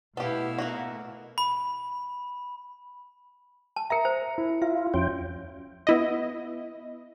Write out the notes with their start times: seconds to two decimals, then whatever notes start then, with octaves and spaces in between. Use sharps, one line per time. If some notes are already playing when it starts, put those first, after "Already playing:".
0.17 B2 A3 B3 E4 G4 A4 F5
0.58 A#3 D#4 F#4 F#5
1.38 B5
3.76 A5
3.90 A#4 E5 A#5 C#7
4.05 C5
4.38 E4
4.62 F4 E5
4.94 F2 C#4 F#4 G5
5.87 B3 E4 D#5